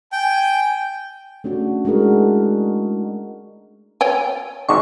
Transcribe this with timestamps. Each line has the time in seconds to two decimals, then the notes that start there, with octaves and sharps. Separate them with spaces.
0.12 G5 G#5
1.44 A3 C#4 D4 F#4
1.85 G#3 D4 E4 F#4 G#4 A#4
4.01 C#5 G5 G#5
4.69 G#1 G#2 D4 C#6